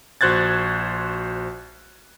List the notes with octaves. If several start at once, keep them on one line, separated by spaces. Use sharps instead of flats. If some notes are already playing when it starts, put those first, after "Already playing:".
A#1 F#4 C5 F#6 G#6 A6